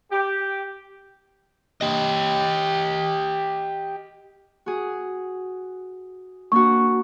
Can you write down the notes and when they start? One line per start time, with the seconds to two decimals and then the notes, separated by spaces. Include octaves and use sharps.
0.11 G4
1.81 G4 D#5
4.66 F#4 G#4
6.52 A#3 D4 F#4 C#6